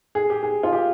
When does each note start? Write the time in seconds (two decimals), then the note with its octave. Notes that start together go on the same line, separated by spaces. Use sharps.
0.15 G#4
0.30 G4
0.43 G#4
0.63 F4
0.73 G4